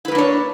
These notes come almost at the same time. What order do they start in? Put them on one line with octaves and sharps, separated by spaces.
E4 B4 A#3 D4 C#5